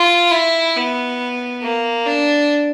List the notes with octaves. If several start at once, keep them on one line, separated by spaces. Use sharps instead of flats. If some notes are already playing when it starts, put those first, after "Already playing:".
Already playing: F4
E4
B3
A#3
D4